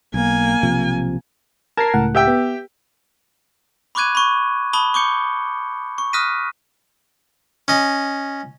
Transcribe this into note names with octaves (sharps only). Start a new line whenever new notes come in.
B1 A#3 G#5
B1 C3 F3
A#4 A5 G#6 A#6 C7
C#2 A2 F#5
G4 E5 G5
B3
B5 C#6 D6 F#6 G#6 D#7
B5 C#6 D6
A5 B5 D#6 G7
C#6 D6 G6 C#7
C#6
D#6 F6 F#6 A#6 B6 D#7
C#4 D#5